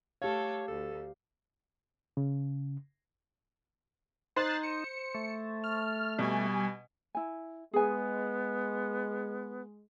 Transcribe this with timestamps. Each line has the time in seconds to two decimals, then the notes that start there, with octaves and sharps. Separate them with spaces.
0.22 A3 G4 A4 C#5 F5
0.68 D2 A4
2.17 C#3
4.36 D#4 C5 F#6 A6 C7
4.63 C#7
5.15 A3
5.64 F6
6.19 B2 G3 G#5
7.15 E4 G#5
7.73 G#3 B3 G#4 G#5